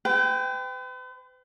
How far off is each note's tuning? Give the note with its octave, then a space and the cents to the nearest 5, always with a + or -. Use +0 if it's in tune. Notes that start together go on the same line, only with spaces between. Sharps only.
B4 +45 G5 +0